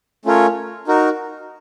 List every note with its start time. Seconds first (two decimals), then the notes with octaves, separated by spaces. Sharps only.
0.25 A3 C#4 F4 A#4 C#5
0.87 D#4 F#4 A#4